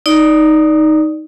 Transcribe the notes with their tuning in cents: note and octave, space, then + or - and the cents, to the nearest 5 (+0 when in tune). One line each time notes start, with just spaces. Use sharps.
D#4 +0 D5 +0